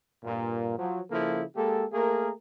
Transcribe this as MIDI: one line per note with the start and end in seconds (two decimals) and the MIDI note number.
0.23 0.75 43
0.23 0.75 46
0.77 1.00 53
0.77 1.00 54
1.10 1.43 49
1.10 1.43 53
1.10 1.43 58
1.10 1.43 64
1.10 1.43 69
1.56 1.84 56
1.56 1.84 58
1.56 1.84 67
1.56 1.84 69
1.93 2.30 57
1.93 2.30 58
1.93 2.30 68
1.93 2.30 70